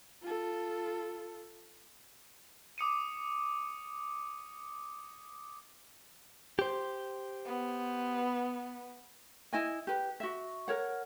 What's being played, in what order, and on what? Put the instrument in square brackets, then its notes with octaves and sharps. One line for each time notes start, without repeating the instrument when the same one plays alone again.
[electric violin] F4 A4
[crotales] D6 D#6 C#7 D#7
[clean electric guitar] G4 C5
[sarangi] B3
[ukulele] E4 D#5 G#5
G4 B4
F#4 E5
A#4 C#5 F#5